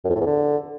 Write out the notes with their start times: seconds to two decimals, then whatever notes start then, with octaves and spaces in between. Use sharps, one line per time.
0.04 F#2
0.10 F2
0.15 A2
0.21 E2
0.26 D3